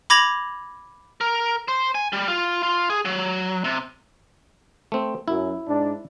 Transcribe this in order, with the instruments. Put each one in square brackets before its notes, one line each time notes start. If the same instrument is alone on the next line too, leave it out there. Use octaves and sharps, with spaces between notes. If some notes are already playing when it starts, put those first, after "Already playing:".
[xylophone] B5 D6 G#6 A#6 F7 F#7
[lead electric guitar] A#4
C5
G#5
G3
F4
F4
G#4
F#3
C3
[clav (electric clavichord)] A3 C4
[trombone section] F#2 [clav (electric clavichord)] E4
[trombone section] G#2 D4